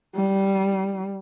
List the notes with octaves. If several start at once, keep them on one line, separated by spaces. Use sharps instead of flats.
G3